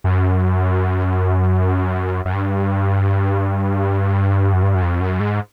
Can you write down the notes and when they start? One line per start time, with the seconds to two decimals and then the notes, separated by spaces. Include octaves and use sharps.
0.04 F#2
2.25 F#2
2.33 G2
4.53 F#2
4.63 G2
4.75 F#2
4.82 F2
5.00 F#2
5.20 G#2